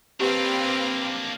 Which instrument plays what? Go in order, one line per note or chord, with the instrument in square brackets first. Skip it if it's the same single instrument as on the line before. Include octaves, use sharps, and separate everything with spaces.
[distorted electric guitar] A#3 D4 [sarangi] C4 [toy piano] G4 [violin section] B4 F5 G5